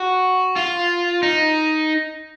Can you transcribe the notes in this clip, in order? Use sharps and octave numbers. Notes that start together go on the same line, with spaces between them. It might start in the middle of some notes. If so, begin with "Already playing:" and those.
Already playing: F#4
F4
D#4